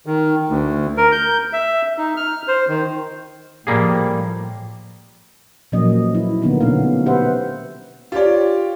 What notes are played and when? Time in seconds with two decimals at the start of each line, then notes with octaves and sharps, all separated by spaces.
0.06 D#3
0.49 D2
0.97 A#4
1.12 G6
1.53 E5
1.98 D#4
2.17 F6
2.48 C5
2.68 D#3
3.67 A2 F3 G3 A#3 G#4
5.72 A#2 F3 F#3 A#3 C#4 D#5
6.15 E4
6.41 D3 A#3 B3 D#4 F4
6.61 B2 A3 B3 C#4 F5
7.06 G4 B4 C5 E5 F#5
8.12 F4 G4 C#5 D5